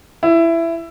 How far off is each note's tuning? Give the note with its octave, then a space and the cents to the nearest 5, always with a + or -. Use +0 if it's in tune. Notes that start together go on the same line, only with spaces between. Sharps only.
E4 +15